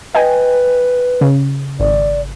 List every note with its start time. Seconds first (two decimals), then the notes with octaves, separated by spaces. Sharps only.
0.15 B4 D#5 G5 G#5
1.21 C#3
1.80 G#1 D5